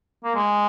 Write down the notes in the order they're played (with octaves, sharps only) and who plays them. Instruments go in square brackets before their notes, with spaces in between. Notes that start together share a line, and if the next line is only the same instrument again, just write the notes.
[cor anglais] A#3
G#3